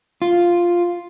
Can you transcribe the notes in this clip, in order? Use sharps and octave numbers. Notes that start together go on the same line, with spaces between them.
F4